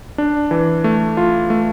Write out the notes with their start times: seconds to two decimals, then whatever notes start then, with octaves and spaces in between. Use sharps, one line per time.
0.18 D4
0.51 E3
0.84 A3
1.17 F4
1.50 A3